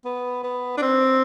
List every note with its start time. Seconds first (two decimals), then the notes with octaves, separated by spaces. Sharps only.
0.05 B3
0.44 B3
0.77 D4
0.82 C4